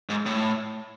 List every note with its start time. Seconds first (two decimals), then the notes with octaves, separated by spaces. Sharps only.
0.09 G#2
0.26 A2